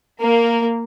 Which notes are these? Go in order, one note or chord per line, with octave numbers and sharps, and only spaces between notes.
A#3